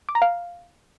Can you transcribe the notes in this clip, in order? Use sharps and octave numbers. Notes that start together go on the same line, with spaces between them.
D6
A#5
F5